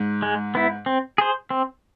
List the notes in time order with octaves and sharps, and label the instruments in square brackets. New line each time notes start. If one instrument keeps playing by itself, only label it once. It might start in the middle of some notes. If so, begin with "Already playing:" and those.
Already playing: [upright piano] G#2
[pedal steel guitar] G#3
B3 E4
C4
G#4 C5
C4